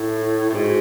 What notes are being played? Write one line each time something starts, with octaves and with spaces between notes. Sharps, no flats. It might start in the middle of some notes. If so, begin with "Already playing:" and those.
Already playing: A2 E4
A2
G#2 F#4 G#4